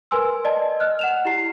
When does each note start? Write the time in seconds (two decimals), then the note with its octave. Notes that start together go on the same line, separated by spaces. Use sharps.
0.11 A#4 B4 G#5 C6 E6
0.45 D5 D#5 A5
0.80 D#5 F6 F#6
0.99 F#5 E7 F7
1.25 E4 G4 A#5 C7